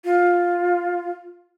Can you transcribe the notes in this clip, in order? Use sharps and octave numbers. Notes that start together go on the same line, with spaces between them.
F4